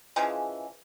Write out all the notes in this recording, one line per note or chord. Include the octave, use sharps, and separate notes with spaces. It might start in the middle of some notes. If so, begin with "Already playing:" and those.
C#3 E3 F3 G#3